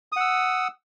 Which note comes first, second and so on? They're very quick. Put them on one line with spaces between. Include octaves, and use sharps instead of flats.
D#6 F#5 E6